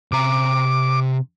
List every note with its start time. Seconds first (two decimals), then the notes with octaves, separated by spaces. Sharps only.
0.12 C3 A#5 D6